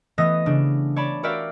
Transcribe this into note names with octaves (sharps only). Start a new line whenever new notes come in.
E3 A3 B3 D#5 D#6 A#6
C#3 D4
C#5 D5 A5 B5
F#4 G4 A#4 D5 E5 F5